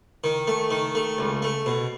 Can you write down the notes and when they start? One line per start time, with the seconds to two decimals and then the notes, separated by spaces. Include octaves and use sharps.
0.24 D#3
0.47 A3
0.71 D#3
0.95 A3
1.18 C#2
1.42 A3
1.66 B2